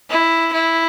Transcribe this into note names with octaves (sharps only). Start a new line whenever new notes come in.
E4
E4